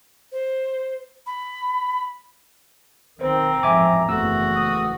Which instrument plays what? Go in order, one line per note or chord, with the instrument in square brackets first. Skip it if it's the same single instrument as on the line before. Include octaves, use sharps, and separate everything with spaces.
[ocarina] C5
B5
[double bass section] B1 D#3 [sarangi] C4 [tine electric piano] C5 [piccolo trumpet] A#5
[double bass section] A1 F2 G#2 [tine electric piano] E5 G#5 D6
[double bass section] F#1 E2 [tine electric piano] A3 E6 [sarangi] F#4
[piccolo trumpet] D#6